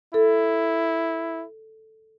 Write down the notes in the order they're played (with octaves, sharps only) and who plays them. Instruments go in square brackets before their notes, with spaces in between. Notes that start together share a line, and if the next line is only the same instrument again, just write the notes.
[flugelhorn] E4 [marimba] A4